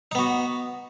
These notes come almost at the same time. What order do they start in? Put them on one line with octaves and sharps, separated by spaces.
D#4 B3 F#4